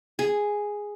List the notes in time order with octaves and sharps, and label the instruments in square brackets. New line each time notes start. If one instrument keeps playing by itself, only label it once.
[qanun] G#4